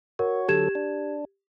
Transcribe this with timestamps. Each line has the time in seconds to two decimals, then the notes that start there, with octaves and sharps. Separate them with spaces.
0.19 F#4 A#4 C#5
0.49 D3 F#3 G4 A4 G#6 E7
0.75 D4